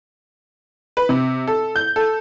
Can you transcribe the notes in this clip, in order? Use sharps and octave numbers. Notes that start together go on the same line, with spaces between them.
B4
C3
A4
G6
A4